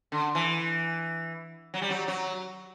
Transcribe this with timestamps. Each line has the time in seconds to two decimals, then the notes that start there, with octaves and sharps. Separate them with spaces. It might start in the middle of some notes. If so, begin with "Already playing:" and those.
0.12 D3
0.35 E3
1.74 F#3
1.82 G3
1.90 F#3
2.08 F#3